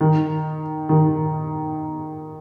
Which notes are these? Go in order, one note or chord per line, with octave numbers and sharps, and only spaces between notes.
D#3
D#3